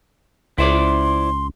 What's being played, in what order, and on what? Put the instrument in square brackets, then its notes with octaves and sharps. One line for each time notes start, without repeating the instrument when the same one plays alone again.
[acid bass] C#2 [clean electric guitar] E4 C5 D5 [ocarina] C6